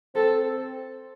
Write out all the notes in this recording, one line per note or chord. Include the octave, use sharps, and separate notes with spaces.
C4 A4